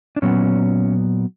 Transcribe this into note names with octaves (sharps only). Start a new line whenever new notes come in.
D4
A#2 F#3 B3 C#4